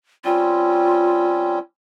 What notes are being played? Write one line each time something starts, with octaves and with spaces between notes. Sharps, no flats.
G3 C4 C#4 F4